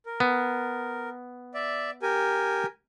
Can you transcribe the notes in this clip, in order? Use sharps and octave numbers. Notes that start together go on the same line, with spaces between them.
A#4
B3
D5 E5
G4 A#4 G#5